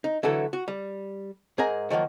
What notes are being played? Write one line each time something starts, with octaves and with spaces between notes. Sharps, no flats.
D#4
D3 E3 F#3 A3 A4
F#4
G3
G#2 G#4 A#4 G#5 A#5
D#3 F3 F#3 A3 A#3